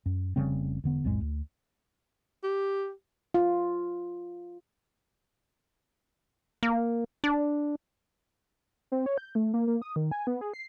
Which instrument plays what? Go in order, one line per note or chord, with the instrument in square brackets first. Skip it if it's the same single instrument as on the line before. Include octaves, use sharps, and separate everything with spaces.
[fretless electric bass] F#2
F1 C#3 G3 C4
E1 D3 B3
B1 F2 A2 G#3
D2
[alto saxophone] G4
[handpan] F4
[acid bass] A#3
D4
[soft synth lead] C4
C#5
G6
A3
A#3
A#3
D#6
D#3
G#5
B3
G#4
C7